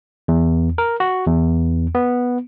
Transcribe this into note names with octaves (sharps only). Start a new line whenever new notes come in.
E2
A#4
F#4
E2
B3